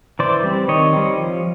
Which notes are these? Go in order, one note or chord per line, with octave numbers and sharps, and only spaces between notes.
E3 C5 D5
G3 C4
D#3 C#5 D#5
G3 C4
F3